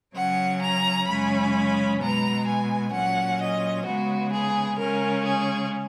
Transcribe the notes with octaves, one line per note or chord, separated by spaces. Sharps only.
C#3 F#3 C#4 F#5
A#5
F#2 C#3 G#3 C#4 B5
B2 G#3 B3 A#5
G#5
A#2 F#3 C#4 F#5
D#5
C#3 G#3 B3 F#4
G#4
C#3 G#3 C#4 A#4
G#4